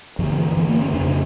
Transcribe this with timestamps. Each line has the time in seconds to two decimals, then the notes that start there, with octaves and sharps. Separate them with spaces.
0.19 G2 F3
0.22 D3
0.38 E3
0.57 E3
0.69 A#3
0.81 C#4
0.94 F2 D4
0.98 C#3
1.09 D4